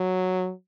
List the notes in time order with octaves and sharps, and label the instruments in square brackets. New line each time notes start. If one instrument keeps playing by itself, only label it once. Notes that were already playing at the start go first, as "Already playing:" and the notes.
Already playing: [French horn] F#3